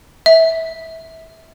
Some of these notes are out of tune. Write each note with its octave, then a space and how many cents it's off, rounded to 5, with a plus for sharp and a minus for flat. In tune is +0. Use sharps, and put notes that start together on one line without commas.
E5 -20